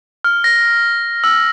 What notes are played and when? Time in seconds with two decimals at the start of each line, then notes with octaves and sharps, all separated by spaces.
0.24 F6
0.44 A#6
1.24 E6